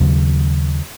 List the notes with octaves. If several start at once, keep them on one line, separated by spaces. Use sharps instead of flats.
D#2 C#3 F#3